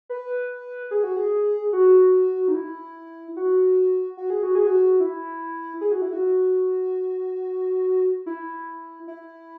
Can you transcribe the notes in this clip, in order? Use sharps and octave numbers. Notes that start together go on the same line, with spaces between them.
B4
G#4
F#4
G#4
F#4
D#4
E4
F#4
F#4
G#4
F#4
G#4
F#4
E4
G#4
F#4
E4
F#4
E4
E4